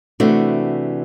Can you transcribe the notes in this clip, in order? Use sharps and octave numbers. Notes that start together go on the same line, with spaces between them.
C3 E3 A3 D4 F#4